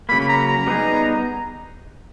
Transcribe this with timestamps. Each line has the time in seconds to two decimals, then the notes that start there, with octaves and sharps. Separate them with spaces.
0.09 C#3 F#3 A#3 B5
0.20 B5
0.28 A#5
0.48 A#5
0.67 G3 B3 D#4 G#4